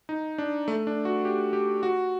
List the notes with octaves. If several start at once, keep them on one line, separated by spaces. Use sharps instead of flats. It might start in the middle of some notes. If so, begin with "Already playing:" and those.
D#4
D4
A3
D4
F#4
G4
G4
F#4